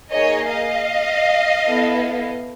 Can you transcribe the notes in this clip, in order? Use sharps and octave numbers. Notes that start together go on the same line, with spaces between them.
A#3 D#4 G#4 C#5 D#5
D#5 F5
B3 E4 A4